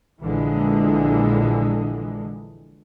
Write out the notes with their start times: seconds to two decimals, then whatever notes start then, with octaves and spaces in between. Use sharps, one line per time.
0.21 A#1 A#2 D3 E3 G#3